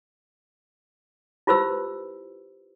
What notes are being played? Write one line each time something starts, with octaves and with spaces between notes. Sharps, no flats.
E4 F4 G4 B4 C5 E6